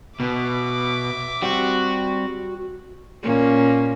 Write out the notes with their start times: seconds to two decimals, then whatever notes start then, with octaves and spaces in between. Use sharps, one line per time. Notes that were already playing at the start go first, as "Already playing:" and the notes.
0.20 B2 E5 D6
1.42 G3 C4 F#4
3.22 A#2 A#3 C#4